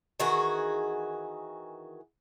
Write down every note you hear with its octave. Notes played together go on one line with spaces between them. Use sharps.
D#3 E3 F#4 G#4